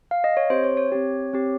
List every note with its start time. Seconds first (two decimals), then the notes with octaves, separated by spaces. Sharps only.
0.11 F5
0.24 D#5
0.37 C#5
0.50 C4 G4 C5
0.64 C#5
0.77 C#5
0.92 C4 G4
1.33 C4 G4